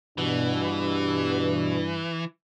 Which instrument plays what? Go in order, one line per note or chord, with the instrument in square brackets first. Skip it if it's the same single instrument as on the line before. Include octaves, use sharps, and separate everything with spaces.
[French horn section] G2 [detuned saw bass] B2 [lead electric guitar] E3 [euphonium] D4